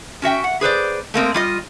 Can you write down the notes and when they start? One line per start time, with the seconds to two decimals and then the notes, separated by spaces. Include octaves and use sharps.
0.22 C#4 F#4 E5 G5
0.44 F#5
0.61 G#4 B4 C5 D5
1.14 A3 A#3 C4 D#5
1.34 G3 F4 D#5